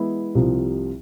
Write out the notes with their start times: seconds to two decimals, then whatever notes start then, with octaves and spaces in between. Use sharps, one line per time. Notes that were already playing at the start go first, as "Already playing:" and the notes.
Already playing: E3 G#3 B3 E4
0.35 C2 C3 F3